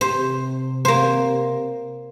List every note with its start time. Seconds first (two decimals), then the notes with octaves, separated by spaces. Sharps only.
0.01 C3 C5
0.85 A#3 C5